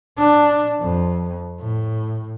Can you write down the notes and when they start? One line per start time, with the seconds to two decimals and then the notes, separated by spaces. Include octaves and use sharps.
0.18 D4
0.81 F2
1.60 A2